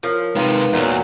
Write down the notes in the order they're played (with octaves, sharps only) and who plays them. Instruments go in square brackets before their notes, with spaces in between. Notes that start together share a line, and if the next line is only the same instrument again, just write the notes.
[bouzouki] F3 [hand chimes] A#4 C#5 F6
[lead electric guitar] C3 G#3 [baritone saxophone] D#3 [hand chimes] B4 F5 C6
[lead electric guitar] E2 [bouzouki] A#2 F#3 [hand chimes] A#4 D5 F#5